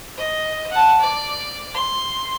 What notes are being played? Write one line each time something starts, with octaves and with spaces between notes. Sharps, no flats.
D#5
F#5 A5
D5
C6